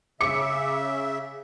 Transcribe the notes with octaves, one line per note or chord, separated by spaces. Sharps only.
C#3 E5 D6 C#7